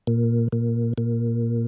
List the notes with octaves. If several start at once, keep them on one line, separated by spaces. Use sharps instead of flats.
A#2
A#2
A#2